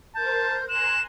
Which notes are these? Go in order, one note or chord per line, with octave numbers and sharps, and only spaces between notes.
A#4 C5 A5 G6
G#5 A#5 C6 F#6 E7